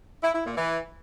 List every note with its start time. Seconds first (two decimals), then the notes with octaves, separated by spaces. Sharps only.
0.22 E4
0.33 E4
0.45 A#2
0.56 E3